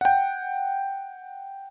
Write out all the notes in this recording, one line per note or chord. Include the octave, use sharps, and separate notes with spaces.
F#5 G5